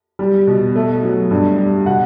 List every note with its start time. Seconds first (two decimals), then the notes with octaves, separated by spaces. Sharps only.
0.19 G3
0.47 B2
0.76 A3
1.03 F#3
1.31 G2
1.58 G3
1.86 B2 F#5